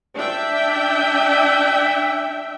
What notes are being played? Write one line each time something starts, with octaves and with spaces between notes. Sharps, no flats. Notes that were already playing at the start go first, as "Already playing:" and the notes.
D4 E5 G5